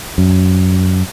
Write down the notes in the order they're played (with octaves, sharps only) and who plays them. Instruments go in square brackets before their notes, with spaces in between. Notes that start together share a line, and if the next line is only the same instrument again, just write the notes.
[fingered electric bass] F#2